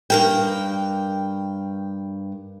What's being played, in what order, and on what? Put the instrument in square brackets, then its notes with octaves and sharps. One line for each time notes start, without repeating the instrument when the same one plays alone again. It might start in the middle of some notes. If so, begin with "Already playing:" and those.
[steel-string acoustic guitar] G2 A#4 G5